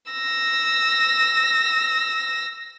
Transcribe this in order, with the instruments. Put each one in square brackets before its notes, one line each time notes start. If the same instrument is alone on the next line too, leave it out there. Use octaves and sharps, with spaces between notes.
[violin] E6 A#6